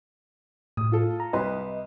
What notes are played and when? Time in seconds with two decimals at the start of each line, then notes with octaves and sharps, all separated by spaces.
0.77 A2 D#6
0.92 F4 A4
1.20 A#5
1.33 C2 B4 D#5 C6